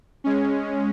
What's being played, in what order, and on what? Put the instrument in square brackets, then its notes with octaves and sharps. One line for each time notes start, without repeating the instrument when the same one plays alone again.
[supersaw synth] G#3 C#4